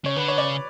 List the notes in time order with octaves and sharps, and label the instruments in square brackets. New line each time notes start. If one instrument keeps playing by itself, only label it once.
[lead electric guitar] C#3 [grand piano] C#5
[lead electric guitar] D3 [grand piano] B4
[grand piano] C#5
[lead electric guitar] C#3 [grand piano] D5